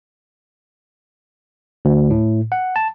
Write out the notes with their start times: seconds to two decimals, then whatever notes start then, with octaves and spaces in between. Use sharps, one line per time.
1.85 D2
2.10 A2
2.52 F#5
2.76 A5